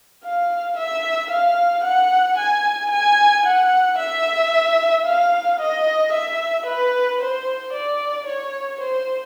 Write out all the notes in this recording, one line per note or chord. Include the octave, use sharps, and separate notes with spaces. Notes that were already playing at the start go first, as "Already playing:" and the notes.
F5
E5
F5
F#5
G#5
G#5
F#5
E5
F5
D#5
E5
B4
C5
D5
C#5
C5